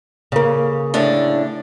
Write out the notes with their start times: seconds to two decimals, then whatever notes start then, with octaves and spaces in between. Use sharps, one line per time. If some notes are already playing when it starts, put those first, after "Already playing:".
0.32 C#3 A#3
0.94 A2 D3 D4